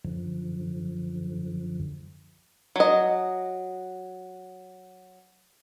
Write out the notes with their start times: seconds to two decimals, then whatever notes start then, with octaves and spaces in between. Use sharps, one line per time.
0.05 F#2 D3 F3
2.76 F#3 D#5